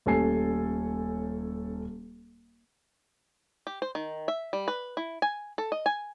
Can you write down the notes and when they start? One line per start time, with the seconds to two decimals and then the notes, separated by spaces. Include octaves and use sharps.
0.06 D#1 A3 C#4 A4 G#5 C7
3.67 G4
3.82 C5
3.95 D#3
4.28 E5
4.53 G3
4.68 B4
4.97 E4
5.22 G#5
5.58 A4
5.72 D#5
5.86 G#5